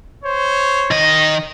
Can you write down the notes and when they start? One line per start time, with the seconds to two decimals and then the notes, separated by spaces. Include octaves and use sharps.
0.24 C5 C#5
0.91 D#3 D#5